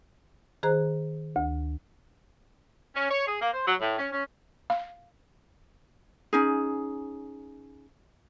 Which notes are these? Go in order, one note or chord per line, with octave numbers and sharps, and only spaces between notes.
D#3 G#4 C5 A#5 F#6
D2
C#4
C#5
G#4
A#3
C5
F#3
A2
C#4
C#4
F5
C#4 D#4 G#4